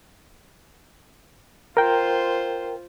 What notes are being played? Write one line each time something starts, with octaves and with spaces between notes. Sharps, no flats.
F4 A#4 C5 G5